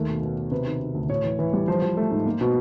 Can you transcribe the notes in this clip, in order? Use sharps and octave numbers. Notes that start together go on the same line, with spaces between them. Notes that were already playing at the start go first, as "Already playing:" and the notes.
Already playing: D#2 A3 A#4
B2
B2
B2
C3 B4
D#3
D#3
D2
A2 C#5
E3
E3
G3
F3 C5
F3
A3
G#2
A#3
B2